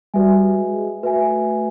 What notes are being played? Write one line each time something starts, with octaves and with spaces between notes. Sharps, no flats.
G3 F#4 B4 E5 G#5
G#3
A3 F#4 B4 E5 G#5